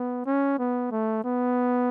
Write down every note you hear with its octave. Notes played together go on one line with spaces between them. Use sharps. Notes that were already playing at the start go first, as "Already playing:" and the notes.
Already playing: B3
C#4
B3
A3
B3